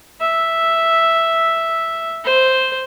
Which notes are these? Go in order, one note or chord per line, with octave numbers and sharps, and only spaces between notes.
E5
C5